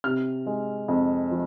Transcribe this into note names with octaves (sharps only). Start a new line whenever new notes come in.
C3 F6
G#3
F2
F3